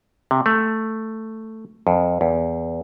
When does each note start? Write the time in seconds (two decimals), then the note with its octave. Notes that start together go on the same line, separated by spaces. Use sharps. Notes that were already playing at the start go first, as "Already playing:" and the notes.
0.31 C3
0.46 A3
1.87 F2
2.21 E2